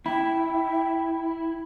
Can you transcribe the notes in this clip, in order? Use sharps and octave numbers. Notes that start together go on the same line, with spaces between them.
E4 G5 B5